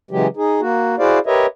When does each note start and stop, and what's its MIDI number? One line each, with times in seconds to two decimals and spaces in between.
0.11 0.27 49
0.11 0.27 52
0.11 0.27 54
0.11 0.27 56
0.11 0.27 67
0.37 0.60 63
0.37 0.60 68
0.61 0.96 58
0.61 0.96 66
0.99 1.19 64
0.99 1.19 66
0.99 1.19 68
0.99 1.19 72
0.99 1.19 74
0.99 1.19 77
1.26 1.46 67
1.26 1.46 70
1.26 1.46 71
1.26 1.46 73
1.26 1.46 75
1.26 1.46 76